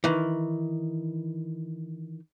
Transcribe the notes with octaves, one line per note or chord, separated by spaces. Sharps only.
D#3 E3